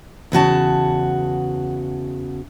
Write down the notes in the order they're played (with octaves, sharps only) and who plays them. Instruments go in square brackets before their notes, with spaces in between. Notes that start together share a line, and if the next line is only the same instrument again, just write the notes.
[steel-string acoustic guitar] E2 C#3 F#4 A5